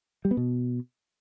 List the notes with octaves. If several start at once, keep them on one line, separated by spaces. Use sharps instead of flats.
G3
B3
B2